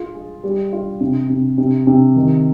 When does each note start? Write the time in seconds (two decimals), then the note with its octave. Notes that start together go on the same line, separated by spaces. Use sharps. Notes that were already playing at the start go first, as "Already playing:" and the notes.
Already playing: F4 G#4
0.14 G#4
0.44 G3
0.73 F4
1.01 C3
1.30 C3
1.58 C3
1.87 C3
2.16 D#3